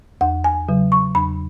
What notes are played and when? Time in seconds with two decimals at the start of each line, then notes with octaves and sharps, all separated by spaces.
0.21 E2 F#5
0.44 G#5
0.69 C#3 F#3
0.92 C#6
1.15 E2 B5